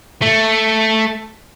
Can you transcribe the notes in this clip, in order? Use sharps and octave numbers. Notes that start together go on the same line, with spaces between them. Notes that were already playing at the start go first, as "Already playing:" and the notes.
A3